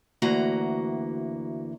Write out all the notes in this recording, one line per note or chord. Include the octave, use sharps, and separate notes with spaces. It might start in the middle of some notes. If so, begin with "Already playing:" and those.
D2 E3 A#3 F#4 A#5